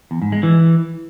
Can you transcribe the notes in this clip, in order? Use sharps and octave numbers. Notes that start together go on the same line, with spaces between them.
E2
G#2
G#3
E3